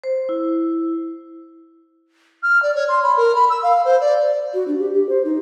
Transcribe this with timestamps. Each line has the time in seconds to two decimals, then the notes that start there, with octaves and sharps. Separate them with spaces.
0.04 C5
0.29 E4
2.43 F6
2.62 D5
2.74 C#5
2.88 C6
3.03 B5
3.17 A#4
3.35 B5
3.49 E6
3.63 F5
3.84 C5
4.00 D5
4.54 F#4
4.68 D4
4.79 G4
4.94 G4
5.09 C5
5.25 D#4